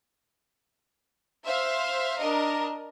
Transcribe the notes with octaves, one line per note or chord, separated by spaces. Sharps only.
C5 E5 F5
D4 A#4 D#5